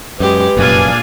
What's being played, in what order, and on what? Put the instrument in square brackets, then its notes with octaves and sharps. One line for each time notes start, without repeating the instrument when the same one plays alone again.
[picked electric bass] F#2 [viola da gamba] G#3 G4 G#4 [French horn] B4
[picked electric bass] F1 F#2 [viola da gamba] A#2 G#4 [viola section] D4 F5 G#5